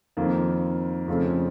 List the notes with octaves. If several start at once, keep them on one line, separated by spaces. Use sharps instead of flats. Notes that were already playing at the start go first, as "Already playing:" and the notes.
F2 D#3 A#3 F4
F2 C#3 A3 C4 F4